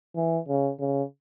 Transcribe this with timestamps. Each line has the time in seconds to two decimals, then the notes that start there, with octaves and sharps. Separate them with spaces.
0.16 E3
0.48 C#3
0.80 C#3